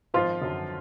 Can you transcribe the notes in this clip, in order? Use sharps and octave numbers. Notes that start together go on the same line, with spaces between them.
G#1 F3 F4
F#2 D3 F#3